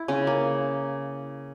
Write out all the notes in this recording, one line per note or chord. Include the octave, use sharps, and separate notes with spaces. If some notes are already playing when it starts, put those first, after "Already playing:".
Already playing: E4
C#3 C#4
A#3